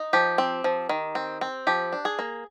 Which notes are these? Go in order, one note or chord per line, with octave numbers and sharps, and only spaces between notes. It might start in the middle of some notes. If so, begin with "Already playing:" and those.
Already playing: D#4
F3 G4
C4
F3
D#3
C4
C4
F3 G4
D4
G#4
A#3